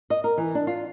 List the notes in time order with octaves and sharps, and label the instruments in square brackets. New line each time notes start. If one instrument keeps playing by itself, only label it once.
[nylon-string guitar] D#5
A#4
E3
D4
F4